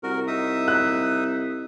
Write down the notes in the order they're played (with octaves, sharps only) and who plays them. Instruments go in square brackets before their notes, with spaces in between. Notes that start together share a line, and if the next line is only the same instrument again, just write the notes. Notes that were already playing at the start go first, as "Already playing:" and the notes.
[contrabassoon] C2 [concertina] F#4 A#4
[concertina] D#4 E5 D#6
[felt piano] F#6